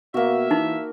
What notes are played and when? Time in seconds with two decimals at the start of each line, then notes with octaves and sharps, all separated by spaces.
0.14 B2 A#3 F#4 E5
0.51 E3 D#4